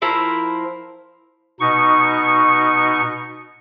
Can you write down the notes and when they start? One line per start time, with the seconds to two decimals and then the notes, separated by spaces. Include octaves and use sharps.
0.02 F3 E4 A#4 C5
1.60 B2 D#4 C#6